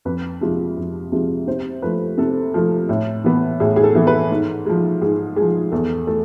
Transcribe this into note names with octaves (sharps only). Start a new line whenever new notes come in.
F2 B4
C3 F3 G#3
F2
C3 F3 G#3
C3 C5
F3 A3 B4
C3 A4
F3 A3
A2
E3 B3
A2 G#4
G#4
A4
E3 B3
B4
G#2
F3 G#3
G#2 G#4
F3 G#3 G#4
E2 A4
A3 A4